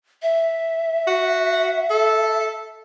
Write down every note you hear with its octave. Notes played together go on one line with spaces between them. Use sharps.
E5
F#4
A4